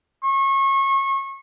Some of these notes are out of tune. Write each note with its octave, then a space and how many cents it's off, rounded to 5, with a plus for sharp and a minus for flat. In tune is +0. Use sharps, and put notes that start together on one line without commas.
C#6 -30